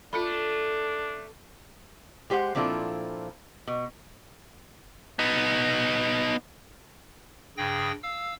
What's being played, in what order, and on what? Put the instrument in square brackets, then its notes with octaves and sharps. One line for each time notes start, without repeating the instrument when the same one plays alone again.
[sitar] A3 [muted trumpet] D4 [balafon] F4 A4 B5
[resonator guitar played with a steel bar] G#3 G4 C5 C#5 F#5
A#2 F3 C4 D4 E4 A4
B2
[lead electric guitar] B3 D#4
[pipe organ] G2 C#3 G#4 G5 A#6
F5 E6